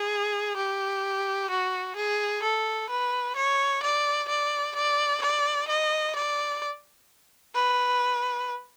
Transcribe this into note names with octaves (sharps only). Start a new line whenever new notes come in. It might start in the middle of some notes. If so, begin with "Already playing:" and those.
Already playing: G#4
G4
F#4
G#4
A4
B4
C#5
D5
D5
D5
D5
D#5
D5
B4